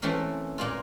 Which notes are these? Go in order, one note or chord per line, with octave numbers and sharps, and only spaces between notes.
E3 A3 C4 C#4 A#4
A#2 A#3 F4